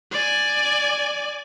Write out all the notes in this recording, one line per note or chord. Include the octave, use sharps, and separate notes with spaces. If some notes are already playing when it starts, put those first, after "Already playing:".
D5 G#5